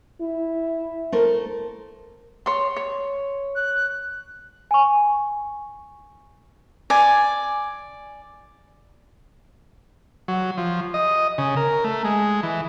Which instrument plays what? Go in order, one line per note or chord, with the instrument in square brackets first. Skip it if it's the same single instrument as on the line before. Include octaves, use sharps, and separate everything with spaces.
[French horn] E4
[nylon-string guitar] A3 A#4 C5
[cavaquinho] C#5 C6
C#5
[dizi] F#6
[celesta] G#5 C#6
[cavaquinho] D5 G#5
[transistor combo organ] F#3
F3
D#5
C#3
A#4
A3
G#3
E3